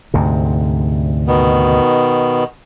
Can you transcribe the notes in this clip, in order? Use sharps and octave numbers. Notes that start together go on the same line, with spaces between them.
D2 G#2 C3
B2 D#3 B3